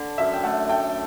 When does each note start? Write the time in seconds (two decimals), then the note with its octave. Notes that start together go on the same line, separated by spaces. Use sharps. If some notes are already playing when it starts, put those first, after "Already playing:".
Already playing: D3
0.18 F#2 E5
0.34 G5
0.43 A3 F#5
0.69 A3 G5